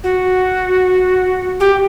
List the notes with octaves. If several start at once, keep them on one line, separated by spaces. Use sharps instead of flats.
F#4
G4